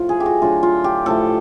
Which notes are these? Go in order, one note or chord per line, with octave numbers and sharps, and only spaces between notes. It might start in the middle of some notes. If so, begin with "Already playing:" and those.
Already playing: A2 F3 A3 F4
G#4
G4
F#4
D3 F#3 A3 F4
F4
G4
A2 F3 A3 A4